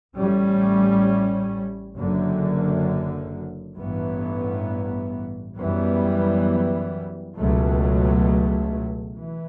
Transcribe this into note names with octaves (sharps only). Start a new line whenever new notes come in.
A1 A2 G3 C#4
F#1 F#2 D3
A1 G2 E3 B3
F#2 E3 G3 B3
C#2 B2 F#3 A3
E3